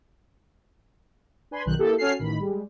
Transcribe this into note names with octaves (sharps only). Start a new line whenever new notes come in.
D4 B4 G#5 B5 C6
B1 D#3 F#6 G6
A#3 E4 G4 A4
C#4 F#4 A4 G#5 F6 C7
A1 D#3 B5
G3 G#3